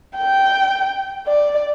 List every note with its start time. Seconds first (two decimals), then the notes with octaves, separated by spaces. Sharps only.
0.17 G5
1.27 D5